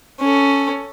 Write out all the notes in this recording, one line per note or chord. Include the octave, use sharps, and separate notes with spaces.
C#4 A4